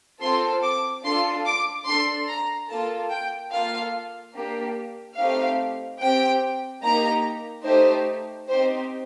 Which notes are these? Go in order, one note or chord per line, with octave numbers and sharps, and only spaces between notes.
C4 F4 A4 C6
D6
D4 F4 A4 C6
D6
D4 A4 C6
A#5
A#3 F4 A4 A5
G5
A#3 F4 A4 F5
A#3 D4 G4
A3 C4 D#4 G4 F5
C4 G4 G5
A#3 D#4 G4 A#5
A3 D#4 G4 C5
C4 D#4 G4 C5